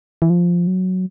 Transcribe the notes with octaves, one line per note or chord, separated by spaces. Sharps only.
E3
F3
F#3